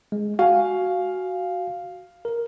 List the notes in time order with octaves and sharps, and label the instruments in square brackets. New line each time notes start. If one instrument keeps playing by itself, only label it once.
[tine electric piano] G#3
[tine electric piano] F#4 G#5 [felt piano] F5
[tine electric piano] A#4